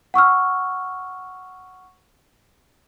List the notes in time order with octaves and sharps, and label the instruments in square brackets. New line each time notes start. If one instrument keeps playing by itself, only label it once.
[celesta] F#5 C#6 E6 F6